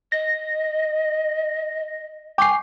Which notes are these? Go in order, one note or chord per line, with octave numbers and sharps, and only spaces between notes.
D#5 A#6
G5 G#5 C#6 D6 C7